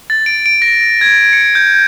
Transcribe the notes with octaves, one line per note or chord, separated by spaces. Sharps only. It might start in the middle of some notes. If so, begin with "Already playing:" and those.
A6
D7
D7
A#6
G#6
C#7
G6